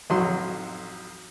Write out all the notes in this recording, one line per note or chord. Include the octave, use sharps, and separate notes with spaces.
A1 F2 F#3 D#4 C6